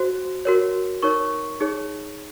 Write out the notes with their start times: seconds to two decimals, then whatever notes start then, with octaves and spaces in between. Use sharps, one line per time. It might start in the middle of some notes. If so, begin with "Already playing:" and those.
Already playing: F#4 C5
0.45 F#4 A#4 C#5
1.02 D#4 A#4 C#5 C#6
1.60 D#4 G#4 C#5